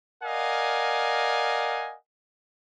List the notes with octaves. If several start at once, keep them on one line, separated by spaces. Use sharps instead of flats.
A#4 D5 D#5 F5 F#5 G#5